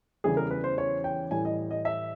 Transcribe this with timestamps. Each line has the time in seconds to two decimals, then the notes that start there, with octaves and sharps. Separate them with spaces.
0.24 E2 C#3 E3 G3 G#4
0.37 A#4
0.51 B4
0.64 C5
0.78 C#5
1.04 G5
1.31 A2 E3 G3 G#5
1.45 D#5
1.71 D#5
1.85 E5